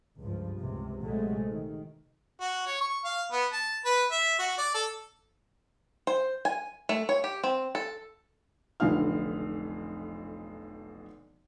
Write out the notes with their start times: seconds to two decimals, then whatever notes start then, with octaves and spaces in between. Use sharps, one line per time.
0.18 C#2 G2 F3
0.59 C#2 A2 C3
1.04 A#1 C3 F#3 G#3 A3
1.49 D#3
2.41 F#4
2.66 C#5
2.81 C#6
3.05 F5
3.32 B3
3.53 A5
3.85 B4
4.11 E5
4.39 F#4
4.58 D5
4.74 A4
6.07 C5
6.45 G#5
6.89 A3
7.09 C#5
7.24 G4
7.44 C4
7.75 A4
8.80 F1 B1 F2 D3 F5 F6